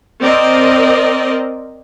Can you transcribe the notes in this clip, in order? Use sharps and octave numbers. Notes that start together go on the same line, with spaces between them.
C4 A#4 D5 D#5